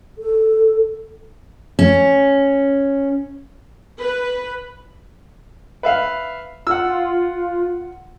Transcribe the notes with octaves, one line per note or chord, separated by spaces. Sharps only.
A4
C#4
B4
B4 E5 F5
F4 F#5 E6